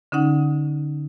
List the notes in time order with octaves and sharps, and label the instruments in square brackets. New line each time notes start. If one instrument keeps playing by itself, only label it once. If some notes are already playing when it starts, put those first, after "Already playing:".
[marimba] D3 C#4 D#4 F#5